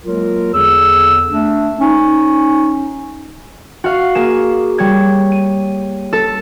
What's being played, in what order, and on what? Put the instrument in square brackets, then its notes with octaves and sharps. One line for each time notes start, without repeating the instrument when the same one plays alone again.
[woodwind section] F#3 G#3 A#3 F4 A#4
E2 D3 G#4 E6
A3 D4
C#4 D#4
[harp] F#4 F5
A#3 G#4 E7
G3 C#5 G#6
D#7
A4